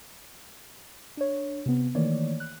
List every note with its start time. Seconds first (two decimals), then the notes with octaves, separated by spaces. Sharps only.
1.17 D4 C#5
1.66 C3 B3
1.95 D#3 E3 A3 A#3 C#5 D5
2.40 F#6